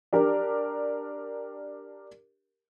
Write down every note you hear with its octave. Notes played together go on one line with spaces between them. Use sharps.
D4 G4 A#4